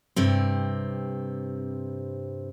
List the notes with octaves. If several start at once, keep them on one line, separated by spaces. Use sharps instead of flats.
G2 C3 C4